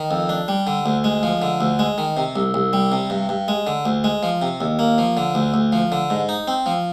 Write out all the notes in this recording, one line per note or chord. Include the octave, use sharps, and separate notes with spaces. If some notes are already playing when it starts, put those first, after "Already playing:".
Already playing: D#3
F2
D4
G3
D3
D2
G#3
F3
D3
D2
G#3
D#3
C3
C2
C2
G3
C3
G2
G2
G#3
D3
D2
G#3
F3
C3
D#2
A#3
F3
D3
D2
D2
F3
D3
G#2
D#4
C4
F3